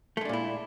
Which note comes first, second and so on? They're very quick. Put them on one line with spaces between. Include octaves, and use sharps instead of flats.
A3 G#3 D4 A#2 E4